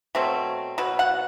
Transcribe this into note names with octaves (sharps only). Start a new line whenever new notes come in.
B2 F#3 A3 C4
B2 F#3 B4
F#5